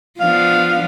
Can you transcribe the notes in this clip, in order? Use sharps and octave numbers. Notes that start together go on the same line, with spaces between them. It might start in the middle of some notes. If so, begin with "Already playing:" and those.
F3 B3 D4 F5